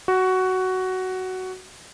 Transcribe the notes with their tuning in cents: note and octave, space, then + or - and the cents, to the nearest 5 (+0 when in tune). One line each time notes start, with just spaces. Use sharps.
F#4 +10